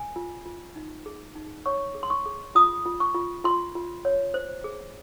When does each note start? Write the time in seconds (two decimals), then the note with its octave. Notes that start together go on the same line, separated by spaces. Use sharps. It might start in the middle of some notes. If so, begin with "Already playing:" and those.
Already playing: G#5
0.16 F4
0.46 F4
0.76 D#4
1.06 G#4
1.35 D#4
1.66 C#5 C#6
1.95 G#4
2.03 C6
2.10 C#6
2.26 G#4
2.55 F4 D#6
2.86 F4
3.00 C#6
3.15 F4
3.44 F4 C6
3.75 F4
4.05 C#5
4.34 C5
4.64 G#4